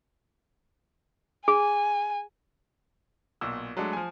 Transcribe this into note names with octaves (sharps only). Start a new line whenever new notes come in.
G#4 G#5
B1 A#2 E6
F#3 G#3 A3 D4
F3 G#5